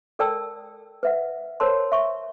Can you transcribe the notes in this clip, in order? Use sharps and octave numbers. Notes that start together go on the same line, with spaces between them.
A4 A#4 D5 G5 A5 E6
B4 E5 F#5
A#4 C5 C#5 A5 A#5 C6
E5 C#6